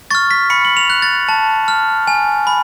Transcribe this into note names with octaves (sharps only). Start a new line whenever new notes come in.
C#6 F6 A6
B6
B5 C#7
F#7
F7
F#6
A6
A5
F6
G#5
B5